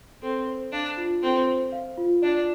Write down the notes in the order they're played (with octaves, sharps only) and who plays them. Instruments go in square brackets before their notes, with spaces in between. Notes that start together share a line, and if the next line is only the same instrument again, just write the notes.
[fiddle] C4 [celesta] A4
[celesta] C5
[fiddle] D4 [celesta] F5
[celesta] F4
[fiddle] C4 [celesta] A4
[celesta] C5
F5
F4
[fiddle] D4 [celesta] D5